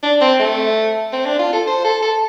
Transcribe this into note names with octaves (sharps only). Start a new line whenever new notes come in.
D4
C4
A3
C4
D4
F4
A4
C5
A4
A4